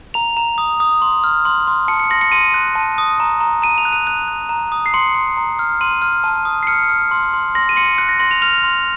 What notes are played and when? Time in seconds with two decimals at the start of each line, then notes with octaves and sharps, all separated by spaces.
0.14 A#5 F7
0.37 A#5
0.58 D#6
0.80 D#6
1.02 C6
1.24 F6
1.45 C6
1.67 C6
1.88 A5 C#7
2.00 C#7
2.10 C6 A#6
2.21 C#7
2.32 C6 D#7
2.54 F#6
2.75 A5
2.98 D#6
3.20 A#5
3.40 A#5
3.62 A#5 D#7
3.78 F7
3.85 F#6
3.92 D#7
4.07 F#6
4.28 F#6
4.49 A#5
4.72 D#6
4.86 C7
4.94 C6 C#7
5.15 C6
5.37 A#5
5.59 F6
5.81 C6 D#7
6.02 F6
6.24 A5
6.45 D#6
6.63 C7
6.67 F6 C#7
6.89 F6
7.11 C6
7.34 C6
7.55 C6 A#6
7.69 D#7
7.76 C6 C#7
7.98 F#6 C#7
8.09 A#6
8.20 C6 A#6
8.31 F7
8.42 F6 F7
8.64 C6